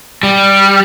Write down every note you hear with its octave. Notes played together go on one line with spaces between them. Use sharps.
G3